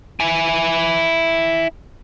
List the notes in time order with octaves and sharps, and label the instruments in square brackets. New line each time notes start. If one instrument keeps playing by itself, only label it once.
[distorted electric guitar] E4 G#5